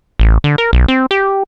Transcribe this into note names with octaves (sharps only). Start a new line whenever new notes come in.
A1
D3
A#4
B1
C4
G4